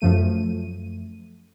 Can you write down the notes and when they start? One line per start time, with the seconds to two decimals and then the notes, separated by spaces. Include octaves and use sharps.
0.01 F#2 F3 A3 D#7